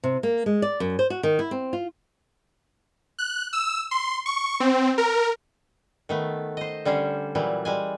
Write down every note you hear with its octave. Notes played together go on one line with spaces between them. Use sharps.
C3
A#3
G#3
D5
F#2
C5
F#4
D#3
E4
C4
F4
F#6
E6
C6
C#6
C4
A#4
D#3 A3 B3
C5 D#5
D3 G3 C#4 C5
A#2 E3 F#3 G3
G3 G#3 G#5